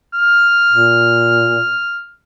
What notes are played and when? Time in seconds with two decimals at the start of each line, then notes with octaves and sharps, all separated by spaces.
0.15 F6
0.72 A#2